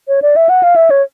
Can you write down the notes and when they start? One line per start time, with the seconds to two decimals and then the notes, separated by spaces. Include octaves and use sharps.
0.08 C#5
0.22 D5
0.36 E5
0.49 F#5
0.63 F5
0.76 E5
0.90 C#5